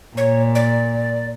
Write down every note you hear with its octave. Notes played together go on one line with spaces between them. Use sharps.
A#2 C#5
D5